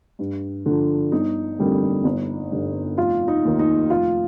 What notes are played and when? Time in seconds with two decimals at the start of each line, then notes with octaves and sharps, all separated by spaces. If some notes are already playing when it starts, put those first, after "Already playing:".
0.19 G2
0.66 D3 F3
1.12 G1 D#4
1.58 F2 D3 G3 A#3
2.04 G1
2.51 G2 D3
2.97 F1 F4
3.28 D#4
3.44 D#2 D#3
3.59 D#4
3.90 F1 F4